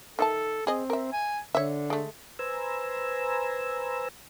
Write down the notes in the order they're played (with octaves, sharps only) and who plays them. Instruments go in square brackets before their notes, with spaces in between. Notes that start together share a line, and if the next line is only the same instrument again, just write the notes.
[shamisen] D#3 E5 A5 [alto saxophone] A4
[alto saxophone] C4 [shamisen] G#4 D#5
[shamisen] A#4 E5
[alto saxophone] G#5
[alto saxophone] D3 [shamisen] C#5 E5
[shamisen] G#3 A3
[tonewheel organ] B4 C5 G#5 A#5 E6